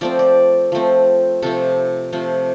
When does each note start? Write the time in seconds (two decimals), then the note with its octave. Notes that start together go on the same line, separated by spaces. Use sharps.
0.01 F3 A3 C4 D5
0.19 D5
0.72 F3 A3 C4
1.42 C3 F3 A3 A4
2.13 C3 F3 A3